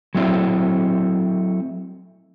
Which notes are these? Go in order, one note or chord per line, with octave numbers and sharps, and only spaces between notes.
F#3 A3 C4 E4